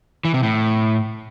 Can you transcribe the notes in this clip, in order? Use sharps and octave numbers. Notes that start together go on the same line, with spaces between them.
E3
C3
A2